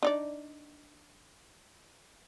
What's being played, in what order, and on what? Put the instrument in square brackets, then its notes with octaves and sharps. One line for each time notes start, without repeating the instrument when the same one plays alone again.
[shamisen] D4 D#4 D5